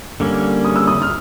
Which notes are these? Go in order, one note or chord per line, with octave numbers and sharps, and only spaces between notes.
D3 G3 A#3 C#4
D#6
E6
D#6
F6